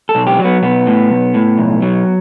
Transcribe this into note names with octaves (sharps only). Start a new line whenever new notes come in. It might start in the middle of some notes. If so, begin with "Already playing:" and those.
A4
B1
G4
F#3
B3
B1 B3
A2
B1
A2
B1
F#3